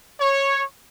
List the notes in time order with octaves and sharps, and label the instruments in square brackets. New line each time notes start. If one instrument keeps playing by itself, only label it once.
[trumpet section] C#5